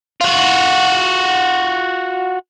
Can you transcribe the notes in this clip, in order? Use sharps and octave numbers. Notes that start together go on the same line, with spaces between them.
F4 F#4